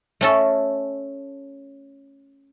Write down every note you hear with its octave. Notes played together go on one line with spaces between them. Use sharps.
A3 C#4 A4